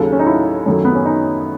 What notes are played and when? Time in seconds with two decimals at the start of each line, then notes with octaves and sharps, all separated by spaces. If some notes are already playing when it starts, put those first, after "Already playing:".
Already playing: D#2 C#3 F#3 A4
0.12 C#4
0.19 D#4
0.27 E4
0.66 F#2 D#3 F#3 A3
0.85 B3
0.95 C#4
1.05 D#4